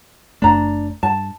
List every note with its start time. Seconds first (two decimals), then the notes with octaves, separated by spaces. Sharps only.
0.42 F#1 F#2 A3 D4 A#5
1.03 G2 A5